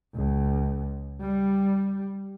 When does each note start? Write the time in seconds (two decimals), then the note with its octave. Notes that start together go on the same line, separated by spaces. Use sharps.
0.15 C#2
1.22 G3